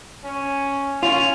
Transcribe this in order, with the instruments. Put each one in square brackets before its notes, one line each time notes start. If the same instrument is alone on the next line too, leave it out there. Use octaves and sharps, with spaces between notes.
[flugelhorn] C#4
[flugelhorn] C#4 [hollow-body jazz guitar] F4 [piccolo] F7